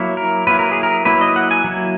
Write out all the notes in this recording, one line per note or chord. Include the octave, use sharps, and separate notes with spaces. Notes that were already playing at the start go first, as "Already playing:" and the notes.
Already playing: F#3 A#3 E4
A#4
F#3 A#3 E4 B4
A#4
G#4
A#4
F#3 A#3 E4 B4
D#5
F#5
G#5
F#3 A#3 E4